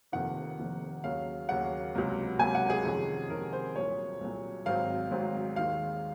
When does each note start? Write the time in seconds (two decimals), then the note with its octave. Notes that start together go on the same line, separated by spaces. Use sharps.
0.12 F1 F2 C3 D#3 A#3 F#5
0.58 F1 F2 C3 D#3 A#3
1.04 D#2 C#3 F#3 A#3 C#4 F5
1.49 D#2 C#3 F#3 A#3 C#4 F#5
1.95 C#2 C3 F#3 A#3
2.39 C#2 C3 F#3 A#3 G#5
2.55 F#5
2.70 G#4
2.85 F2 C3 D#3 G#3 C#4
3.30 F2 C3 D#3 G#3 C#4 A#4
3.53 C5
3.76 C2 A#2 F#3 C#5
4.21 C2 A#2 F#3
4.66 G#1 G#2 F#3 C4 F5
5.11 G#1 G#2 F#3 C4
5.56 D#2 D#3 G#3 F5